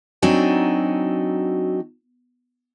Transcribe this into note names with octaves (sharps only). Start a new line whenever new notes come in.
F#3 C4 D4 D#4 F#4 G#5